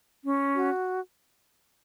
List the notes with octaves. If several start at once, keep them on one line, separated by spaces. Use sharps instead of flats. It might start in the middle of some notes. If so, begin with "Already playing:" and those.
C#4
F#4